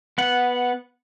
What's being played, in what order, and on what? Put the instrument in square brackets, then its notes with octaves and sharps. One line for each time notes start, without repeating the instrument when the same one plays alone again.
[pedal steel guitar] B3 F#5